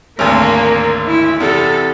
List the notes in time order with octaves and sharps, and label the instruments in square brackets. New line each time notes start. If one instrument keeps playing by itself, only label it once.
[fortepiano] G#1 D2 [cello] A#3
[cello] E4
[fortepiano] E2 C3 [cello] A4